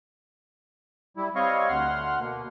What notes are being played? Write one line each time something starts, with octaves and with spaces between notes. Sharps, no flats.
G3 E4
G3 C4 C#5 D#5 F5 C#6
D2 F#5 C6 F6
B2 A#3